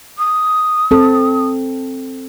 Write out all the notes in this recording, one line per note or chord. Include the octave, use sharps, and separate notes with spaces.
D#6
C4 A4